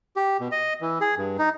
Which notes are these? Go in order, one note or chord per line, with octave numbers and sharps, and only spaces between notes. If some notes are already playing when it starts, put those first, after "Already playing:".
G4
B2
D#5
E3
G#4
G2
D#4